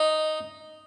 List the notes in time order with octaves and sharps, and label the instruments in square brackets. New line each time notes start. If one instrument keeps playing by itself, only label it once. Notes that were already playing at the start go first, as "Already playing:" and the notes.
Already playing: [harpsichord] D#4